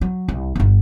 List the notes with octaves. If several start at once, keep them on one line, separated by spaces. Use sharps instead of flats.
F#3
C2
G1 B3